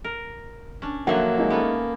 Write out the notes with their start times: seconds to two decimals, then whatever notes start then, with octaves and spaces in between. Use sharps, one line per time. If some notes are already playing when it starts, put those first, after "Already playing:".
0.04 A#4
0.82 C#4 D4
1.07 D3 F3 F#3 A#3 E5 F#5
1.37 G#3 D#4 E4
1.50 B3 C#4 A4